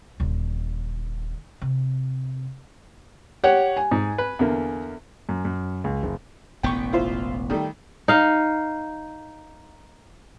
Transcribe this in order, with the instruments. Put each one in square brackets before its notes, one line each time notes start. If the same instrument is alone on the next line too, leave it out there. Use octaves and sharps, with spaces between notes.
[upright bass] D#1 D3
C3
[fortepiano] G4 [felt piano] C#5 F#5
[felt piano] G#5
[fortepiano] G#2
B4
E2 D3 A#3
[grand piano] F#2
F#2
C#2
F#1
[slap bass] E1 A1 B3 [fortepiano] G5 C#6
[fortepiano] E4 F4 C5
D#3 G3 A3
[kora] D#4 F5